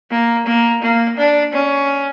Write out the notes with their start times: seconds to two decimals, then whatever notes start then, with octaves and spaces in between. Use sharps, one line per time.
0.11 A#3
0.46 A#3
0.82 A#3
1.18 D4
1.54 C#4